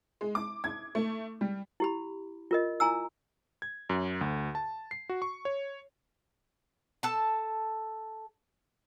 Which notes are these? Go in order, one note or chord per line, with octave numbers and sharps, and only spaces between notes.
G#3
D6
G#6
A3
G3
E4 G4 B5
F4 A#4 D#5
E4 G#5 A#5 E6
G#6
F#2
D2
A5
C7
F#4
C#6
C#5
A4 A5